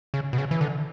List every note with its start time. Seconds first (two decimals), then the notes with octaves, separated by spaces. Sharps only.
0.14 C#3
0.33 B2
0.38 C#3
0.51 E3
0.61 D3